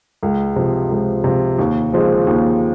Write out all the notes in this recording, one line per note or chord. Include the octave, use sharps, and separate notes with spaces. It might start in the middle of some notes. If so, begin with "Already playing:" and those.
C#2
C3 F3
C#2
C3 F3
D#2
C#3 F3 G#3 C4
D#2